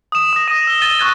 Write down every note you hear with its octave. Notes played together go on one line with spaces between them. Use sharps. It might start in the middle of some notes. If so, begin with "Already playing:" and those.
D#6 E7
D#6 A#6
D#6 A#6 D#7
E6 G7
A6 D#7 G7
C#6 D#6 F#6 G#6 A6 D#7